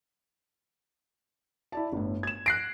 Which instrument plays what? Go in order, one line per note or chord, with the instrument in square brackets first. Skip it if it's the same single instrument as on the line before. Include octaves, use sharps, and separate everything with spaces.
[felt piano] E4 D5 A5
G1 A2
G#6 E7
[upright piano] F#6 C7 D7 [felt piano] A#6